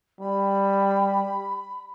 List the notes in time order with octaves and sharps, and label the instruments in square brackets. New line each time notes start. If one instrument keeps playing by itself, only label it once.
[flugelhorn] G3 [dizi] B5